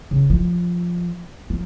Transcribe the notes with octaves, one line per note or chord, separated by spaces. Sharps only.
C#3
F3
F3